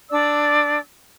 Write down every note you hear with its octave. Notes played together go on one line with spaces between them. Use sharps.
D4 D5 D6 E6